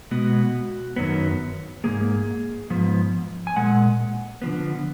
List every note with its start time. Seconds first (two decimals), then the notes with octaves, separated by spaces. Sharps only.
0.11 B2 G#3 B3 F#4
0.96 F#2 D#3 F#3 B3
1.84 G#2 F3 A#3 G#4
2.70 G#2 F3 B3
3.47 G#5
3.56 A#2 G#3 F#5
4.42 D3 F3 B3